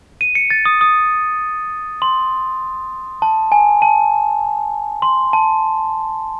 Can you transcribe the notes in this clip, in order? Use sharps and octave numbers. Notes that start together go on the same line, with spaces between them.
D#7
C#7
A6
D#6
D#6
C6
A5
G#5
A5
C6
A5